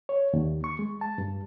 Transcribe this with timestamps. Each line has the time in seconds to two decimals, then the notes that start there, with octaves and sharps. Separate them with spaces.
0.09 C#5
0.33 D#2
0.64 C#6
0.79 G#3
1.01 A5
1.18 G2